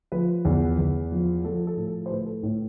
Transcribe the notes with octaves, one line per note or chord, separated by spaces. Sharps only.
F3 B4
E2
E2
F3
F3 A4
A4
A2
A4
C5
A2 B4
A4
A2